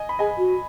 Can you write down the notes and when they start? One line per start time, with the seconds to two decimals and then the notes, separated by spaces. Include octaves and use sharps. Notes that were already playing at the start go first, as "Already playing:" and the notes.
Already playing: D#5 G#5
0.09 B5
0.19 G#4 D#5 G#5
0.37 F#4